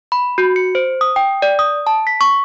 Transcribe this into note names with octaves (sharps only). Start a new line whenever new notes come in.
B5
F#4
C#7
C5
D#6
G5
D5
D#6
A5
B6
C#6